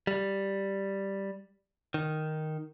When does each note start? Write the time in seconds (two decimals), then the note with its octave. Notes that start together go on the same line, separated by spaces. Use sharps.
0.07 G3
1.94 D#3